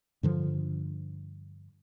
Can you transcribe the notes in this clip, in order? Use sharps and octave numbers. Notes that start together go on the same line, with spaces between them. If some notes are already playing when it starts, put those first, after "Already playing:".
G2 D3 F3